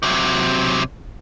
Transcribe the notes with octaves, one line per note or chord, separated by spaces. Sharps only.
C3 F#3